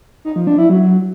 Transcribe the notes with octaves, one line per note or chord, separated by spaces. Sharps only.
D#4
F3
D4
E4
F#3